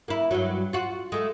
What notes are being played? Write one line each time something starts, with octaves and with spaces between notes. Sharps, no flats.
A#3 E4
G2 F#3
F4 F#4
G#3 A3